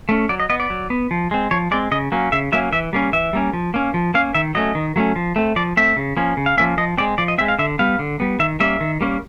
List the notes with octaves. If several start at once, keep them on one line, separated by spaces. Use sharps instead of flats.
A3 C#4
F#3 D5
D#5
B3 D#5
D5
F#3
B3
F3
G#3 C4
F3 C#5
G#3 C4 D5
C#3 D#5
F#3 A#3 C#4
C#3 E5
F#3 A#3 C#4 E5
E3 E5
G3 A#3 C#4
E3 E5
G3 A#3 C#4
F3
A#3 C#4
F3
A#3 C#4 F5
D#3 E5
F#3 A3 C#4 D#5
D#3
F#3 A3 C#4
F3
A3 C4
F3 D5
A3 C4 E5
C#3
F3 A#3 C#4
C#3
F5
F3 A#3 C#4 E5
F3 D#5
G#3 C4 D5
F3 D5
D#5
G#3 C4 E5
F5
D3 E5
G3 B3 F5
D3
G3 B3
D#3 E5
G3 A#3 C#4 E5
D#3
G3 A#3 C#4